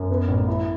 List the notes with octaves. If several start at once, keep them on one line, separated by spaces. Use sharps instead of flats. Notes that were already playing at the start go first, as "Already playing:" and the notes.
Already playing: F#2
B3
A1
E4